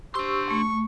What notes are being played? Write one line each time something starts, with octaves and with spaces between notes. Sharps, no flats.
D4 G4 C5 C6 C#6 E6
A3 C#6